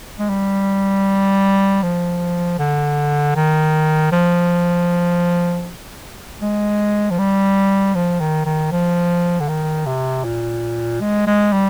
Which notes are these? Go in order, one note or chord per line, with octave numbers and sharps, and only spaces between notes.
G#3
G3
F3
D3
D#3
F3
G#3
F3
G3
F3
D#3
D#3
F3
D3
D#3
C3
A#2
G#3
G#3
G3